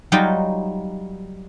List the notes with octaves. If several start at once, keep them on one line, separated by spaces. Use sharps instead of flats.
F#3 G3 D#4 F4 D#5 G5